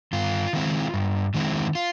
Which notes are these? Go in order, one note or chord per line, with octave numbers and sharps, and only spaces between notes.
G2 F4
D#3 G#3 C4 E4
G2
D#3 G#3 C4 E4
F4